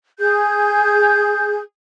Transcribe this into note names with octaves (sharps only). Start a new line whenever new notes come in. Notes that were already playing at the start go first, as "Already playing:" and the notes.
G#4 G6